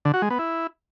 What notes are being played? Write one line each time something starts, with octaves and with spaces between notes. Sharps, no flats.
D3
F#4
G#3
B3
E4